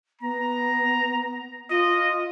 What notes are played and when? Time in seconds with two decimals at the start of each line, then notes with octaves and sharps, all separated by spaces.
0.21 B3 A#5
1.70 F4 D#5